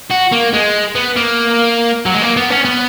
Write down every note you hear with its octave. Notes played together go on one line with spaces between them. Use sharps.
F#4
A#3
G#3
B3
A#3
F#3
G#3
A#3
B3
C#4
B3